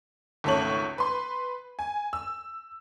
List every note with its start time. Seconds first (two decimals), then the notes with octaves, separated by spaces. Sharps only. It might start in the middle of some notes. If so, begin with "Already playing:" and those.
0.44 G#1 C#2 A3 A4 C#5 F#7
0.98 B4 C6
1.79 G#5
2.13 E6